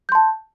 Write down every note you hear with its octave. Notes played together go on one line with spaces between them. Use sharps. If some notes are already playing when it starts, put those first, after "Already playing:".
A5 C6 G6